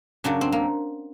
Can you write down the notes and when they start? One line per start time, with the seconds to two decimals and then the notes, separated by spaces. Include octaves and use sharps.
0.24 F#2 C#3 F#3 D4
0.41 C4
0.52 A#3